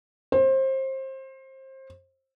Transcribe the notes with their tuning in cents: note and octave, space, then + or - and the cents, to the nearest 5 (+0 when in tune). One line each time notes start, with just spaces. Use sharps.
C5 +25